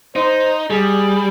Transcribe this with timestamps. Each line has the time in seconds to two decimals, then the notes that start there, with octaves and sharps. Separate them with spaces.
0.16 D#4 C5
0.70 G3 G#4